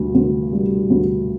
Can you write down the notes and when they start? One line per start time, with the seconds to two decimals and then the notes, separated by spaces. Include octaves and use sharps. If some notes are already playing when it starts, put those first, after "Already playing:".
Already playing: D2 G3
0.15 D2
0.53 G3
0.90 D2